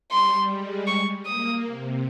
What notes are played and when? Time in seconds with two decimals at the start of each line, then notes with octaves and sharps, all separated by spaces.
0.11 G3 C6
0.49 G#3
0.88 C#6
1.26 A#3 D#6
1.65 C3